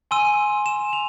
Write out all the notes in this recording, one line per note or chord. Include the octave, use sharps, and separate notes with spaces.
G#5 C6 E6 D#7
E7
F7